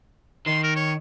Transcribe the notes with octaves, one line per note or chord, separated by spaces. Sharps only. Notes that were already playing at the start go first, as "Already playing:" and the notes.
D#3 C6
A#4
C#5